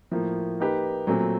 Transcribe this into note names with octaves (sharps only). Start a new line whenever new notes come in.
A2 F3 A#3
A#3 D#4 G4 B4
A#2 F#3 A3 C4